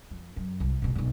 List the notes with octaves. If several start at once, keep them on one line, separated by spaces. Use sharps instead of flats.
F2
F#2
C2
G#2 B2
B1 G2